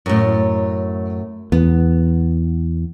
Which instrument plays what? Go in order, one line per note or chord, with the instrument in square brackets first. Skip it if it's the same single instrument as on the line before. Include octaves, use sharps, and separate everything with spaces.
[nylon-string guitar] F#2 A2
[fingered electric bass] E2 [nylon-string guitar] B3